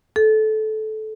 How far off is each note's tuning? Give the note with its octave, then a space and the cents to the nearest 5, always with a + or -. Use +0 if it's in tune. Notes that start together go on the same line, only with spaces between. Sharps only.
A4 -20